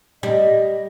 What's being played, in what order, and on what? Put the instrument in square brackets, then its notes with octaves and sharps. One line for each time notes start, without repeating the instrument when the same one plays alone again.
[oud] G3 [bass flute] D#5